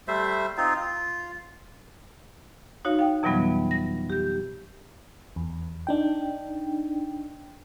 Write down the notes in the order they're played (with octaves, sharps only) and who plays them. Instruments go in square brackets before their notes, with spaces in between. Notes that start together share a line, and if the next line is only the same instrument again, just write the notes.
[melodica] G3 A3 C5 E5
C4 D#4 F4
F4
[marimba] D#4 F#4 C#5 F5
F5 G5
F2 B2 E3 F#3 G3 B3
A#6
G4 G6
[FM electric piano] E2
D4 D#4 G5